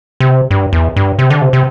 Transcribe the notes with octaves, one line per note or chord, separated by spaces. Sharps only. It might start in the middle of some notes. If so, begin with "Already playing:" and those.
C3
G2
E2
G2
C3
D3
C3
C3